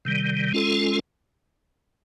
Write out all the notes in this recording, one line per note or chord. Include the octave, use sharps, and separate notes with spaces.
C3 D#3 G3
G#3 C#4 F4 A4